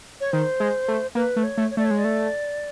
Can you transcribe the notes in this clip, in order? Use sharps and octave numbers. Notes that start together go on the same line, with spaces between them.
C#5
D#3 C5
G#3
A3
A#3 B4
A3
C#5
A3
C#5
A3 D5
C#5
G#3
D5
A3